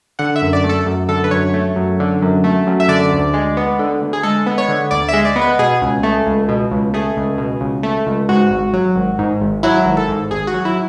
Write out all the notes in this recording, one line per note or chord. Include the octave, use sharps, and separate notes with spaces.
D3 F#5
E5
F#2
D5
A3
A4
F#2
D3 A4
B4
F#2 C#5
A3
F#2
D3
F#2
A3
F#2
E5
D3 D5
D2
G#3
B3
D3
D2
G#4
G#3 A4
B3
C#5
D3
D2 D5
G#3 E5
D5
B3
B4
B2 G#4
C#2
A3
C#2
B2
C#2
A3 G#4
C#2
B2
C#2
A3
C#2
G#2 F#4
G#1
F#3
G#1
G#2
G#1
F#3 E4
G#1
A4
G#2
G#1 G#4
F#4
F#3
E4